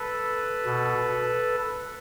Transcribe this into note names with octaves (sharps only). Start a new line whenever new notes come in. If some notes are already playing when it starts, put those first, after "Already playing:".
Already playing: A4 B4
B2